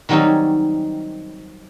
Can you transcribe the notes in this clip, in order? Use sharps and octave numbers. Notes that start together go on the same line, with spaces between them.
D#3 F#3 G3 C4 C#4 D#4